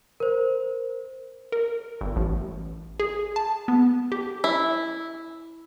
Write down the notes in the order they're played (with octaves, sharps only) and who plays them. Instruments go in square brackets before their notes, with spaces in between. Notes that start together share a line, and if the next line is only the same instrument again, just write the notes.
[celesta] A#4 C5
[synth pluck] A#4
G1
A1
G#4
A5
B3
G4
[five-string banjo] E4